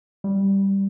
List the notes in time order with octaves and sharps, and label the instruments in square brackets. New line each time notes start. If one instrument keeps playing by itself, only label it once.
[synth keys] G3